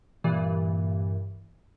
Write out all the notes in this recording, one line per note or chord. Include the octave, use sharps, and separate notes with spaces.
G2 A#2 E3